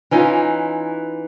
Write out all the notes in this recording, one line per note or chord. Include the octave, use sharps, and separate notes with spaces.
E3 C#4 D#4 F4